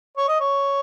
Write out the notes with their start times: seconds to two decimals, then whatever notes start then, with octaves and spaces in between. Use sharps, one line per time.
0.17 C#5
0.28 D#5
0.40 C#5